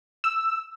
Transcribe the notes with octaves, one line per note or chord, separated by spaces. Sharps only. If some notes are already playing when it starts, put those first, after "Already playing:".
E6